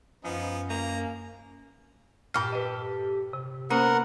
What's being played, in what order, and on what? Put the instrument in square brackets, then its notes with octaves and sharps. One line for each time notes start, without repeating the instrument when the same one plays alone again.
[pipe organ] F#2 C#4 [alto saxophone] F3 [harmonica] B3 D#4
[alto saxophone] A#3 [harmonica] A#5
[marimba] G2 A#2 F6 [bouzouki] G4 A4
[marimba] B4 D#5
C3
[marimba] A#3 C#4 C5 [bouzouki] B3 [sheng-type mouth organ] A#4 F#5